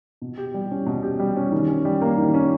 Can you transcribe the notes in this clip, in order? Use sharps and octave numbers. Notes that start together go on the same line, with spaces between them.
B2
G4
G3
C#4
B2
G4
G3
C#4
D#3
C#4
G3
A#3
D#3
C#4